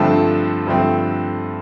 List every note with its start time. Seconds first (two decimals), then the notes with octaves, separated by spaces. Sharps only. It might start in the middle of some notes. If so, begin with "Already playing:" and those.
Already playing: G2 D3 F3 A3 C4 A5
0.66 G2 D3 F3 A3 C4